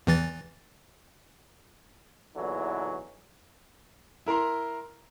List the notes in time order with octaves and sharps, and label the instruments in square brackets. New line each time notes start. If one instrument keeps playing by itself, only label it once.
[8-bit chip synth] E2 E3 A6
[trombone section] E2 A#2 D3 E3 F#3 D#4
[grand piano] E4 A#4 A#5 C6